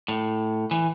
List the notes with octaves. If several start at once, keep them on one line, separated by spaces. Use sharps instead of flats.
A2
E3